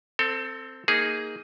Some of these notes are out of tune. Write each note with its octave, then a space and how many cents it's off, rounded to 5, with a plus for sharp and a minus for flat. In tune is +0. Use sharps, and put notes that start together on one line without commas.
C4 +0 A4 +25
A#3 +0 D#4 +15 G#4 +0